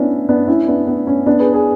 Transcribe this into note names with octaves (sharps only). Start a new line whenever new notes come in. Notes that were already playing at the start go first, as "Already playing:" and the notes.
Already playing: B3 C#4 D4 E4
B3 D4
C#4 E4
B3 D4
B3
C#4
B3 D4
G#4 B4
G#4 B4